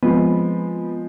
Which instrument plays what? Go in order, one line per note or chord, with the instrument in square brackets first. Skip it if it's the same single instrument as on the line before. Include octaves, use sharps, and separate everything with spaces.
[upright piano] F3 G#3 C4 [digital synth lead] B3